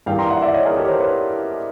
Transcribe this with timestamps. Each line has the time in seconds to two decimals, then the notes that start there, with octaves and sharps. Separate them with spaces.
0.06 G2 E3 G3 A#3 F5 G5
0.19 A#5 C6
0.30 E5 F#5
0.42 D5 E5
0.54 C#5 D#5
0.65 G#4 A#4
0.77 G4 A4
0.84 C#5
0.88 A#4 C5
1.00 B4 C#5